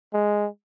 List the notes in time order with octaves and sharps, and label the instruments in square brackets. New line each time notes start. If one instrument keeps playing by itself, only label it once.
[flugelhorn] G#3